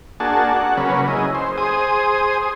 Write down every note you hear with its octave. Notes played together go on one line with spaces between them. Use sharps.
A#3 D4 F#4 G#4 A5
F#5
C#3 F#3 A#3 C#4 B4
E4 G#4 D#5
C5
G#4 C5 D#6